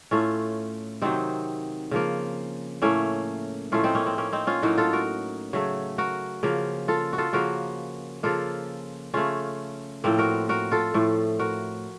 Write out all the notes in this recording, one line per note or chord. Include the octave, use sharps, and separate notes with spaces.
A2 A3 C#4 F4
C3 D#3 F#3 C4 D#4
C#3 F3 A#3
A2 A3 A#3 C#4
A2 F3 A3 C#4 F4
C4 D#4
A#3 C#4
C4
A#3 C#4
C4 D#4
C#4 F4
A2 F#3 A#3 D#4 F#4
F4 A4
F#4 A#4
C#3 F#3 A3
F#4 A#4
C#3 F3 A#3
F4 A4
F#4
F4 A4
C#3 F3 A#3 F#4 A#4
C#3 F3 A#3 F4 A4
C#3 A3 C#4 F4
A2 F3 A#3 C4
F#4 A#4
F#4 A#4
F4 A4
A2 F3 A3
F#4 A#4